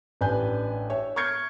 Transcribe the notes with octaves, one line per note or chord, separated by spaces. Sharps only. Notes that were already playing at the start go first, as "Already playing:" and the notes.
A1 D4 B4 G#5 G6
C#5 E5
C#6 F6 G6 G#6 C#7